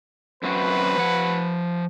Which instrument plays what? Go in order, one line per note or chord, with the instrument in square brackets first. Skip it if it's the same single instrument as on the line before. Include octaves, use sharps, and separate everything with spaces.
[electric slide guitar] F#2 C4 F#4 [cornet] B4
[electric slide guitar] F3 F#5